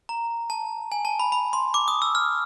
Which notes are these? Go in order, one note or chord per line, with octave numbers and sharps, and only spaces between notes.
A#5
A5
G#5
A5
B5
B5
C6
D6
D#6
E6
F6